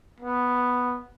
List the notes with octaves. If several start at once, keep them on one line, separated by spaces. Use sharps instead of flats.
B3